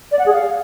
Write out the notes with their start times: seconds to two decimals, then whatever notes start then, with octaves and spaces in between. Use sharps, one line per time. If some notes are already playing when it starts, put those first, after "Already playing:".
0.12 D5
0.19 F#5
0.26 G#4
0.33 F5